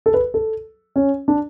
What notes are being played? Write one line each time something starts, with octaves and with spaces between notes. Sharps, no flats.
A4
B4
A4
C#4
D4